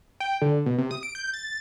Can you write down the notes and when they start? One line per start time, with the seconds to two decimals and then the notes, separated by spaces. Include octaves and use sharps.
0.20 G5
0.42 D3
0.66 B2
0.78 C3
0.91 D#6
1.03 D7
1.15 G6
1.34 A6